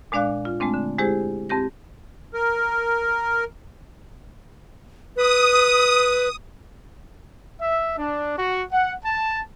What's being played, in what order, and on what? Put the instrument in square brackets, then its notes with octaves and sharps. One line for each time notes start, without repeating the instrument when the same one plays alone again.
[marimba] A#2 G#3 D4 D5 F5 F#6
F4
G#3 A3 C4 D4
D3
G#3 E4 G4 G#4 C5
F2 C4 G4 A#6
[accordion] A#4
[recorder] B4 [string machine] D#6
[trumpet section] E5
D4
F#4
F#5
A5